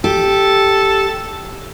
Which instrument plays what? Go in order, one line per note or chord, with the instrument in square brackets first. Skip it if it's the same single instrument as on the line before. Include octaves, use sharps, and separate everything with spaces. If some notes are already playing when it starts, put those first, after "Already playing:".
[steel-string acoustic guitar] G4 [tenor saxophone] A4